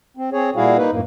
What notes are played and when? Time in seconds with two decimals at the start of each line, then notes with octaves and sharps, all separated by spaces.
0.17 C4
0.33 C4 G#4 C#5
0.56 A#2 G3 E4 F#4 G#4 F5
0.77 A#3 D#4 B4
0.91 F#2 A2 A#3